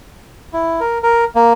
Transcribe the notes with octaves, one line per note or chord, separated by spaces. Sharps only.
E4
A#4
A#4
A#3